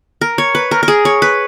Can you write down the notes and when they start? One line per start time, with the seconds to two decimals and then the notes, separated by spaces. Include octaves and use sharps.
0.21 A#4
0.38 C#5
0.55 B4
0.71 A#4
0.83 A#4
0.88 G#4
1.05 C#5
1.22 B4